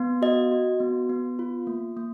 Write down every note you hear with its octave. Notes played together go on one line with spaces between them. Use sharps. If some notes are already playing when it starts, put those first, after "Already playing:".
Already playing: B3
F#4 D#5
F#4
B3
B3
F4
A#3
A#3